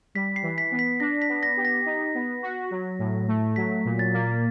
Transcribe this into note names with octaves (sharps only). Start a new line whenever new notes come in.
G3 B6
C7
E3
B6
B3
B6
D4 A#6
B6
B3
A#6
G4
A#6
D#4
B3
F#4
F#3
A2
A3
F#3 B6
A#2
A6
A#3